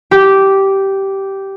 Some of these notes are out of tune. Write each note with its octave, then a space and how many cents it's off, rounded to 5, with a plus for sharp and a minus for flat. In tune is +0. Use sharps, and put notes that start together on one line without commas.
G4 -10